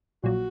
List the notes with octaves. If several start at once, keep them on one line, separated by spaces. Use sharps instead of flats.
A#1 A#2 F#3 F#4